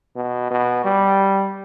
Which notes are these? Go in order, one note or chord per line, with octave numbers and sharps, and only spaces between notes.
B2
B2
G3